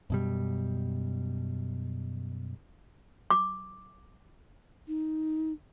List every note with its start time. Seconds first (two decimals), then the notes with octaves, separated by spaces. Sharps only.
0.10 F#2 B2 G3
3.31 D6
4.88 D#4